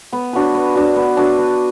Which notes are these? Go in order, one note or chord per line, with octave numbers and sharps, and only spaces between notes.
B3
D4 F#4 B4
B3
D4 F#4 B4
B3
D4 F#4 B4
B3